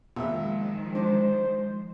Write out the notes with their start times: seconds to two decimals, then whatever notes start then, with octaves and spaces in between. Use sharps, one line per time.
0.16 A#1 D#3 F3 G#3 E5
0.95 D4 C5